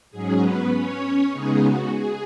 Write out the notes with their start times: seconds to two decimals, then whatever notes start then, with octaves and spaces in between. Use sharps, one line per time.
0.11 G#2 F#3 C#4 G#4
0.41 B3 B4
0.71 C#4 C#5
1.31 C#3 G#3 B3 D#4 G#4
1.61 F#4
1.91 G#4